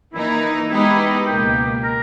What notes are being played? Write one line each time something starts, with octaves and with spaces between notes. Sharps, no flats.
E3 A#3 D#4 E4
G#3 B3 D#4 E4 G4 B4
C#2 B2 A#3 G4
A#4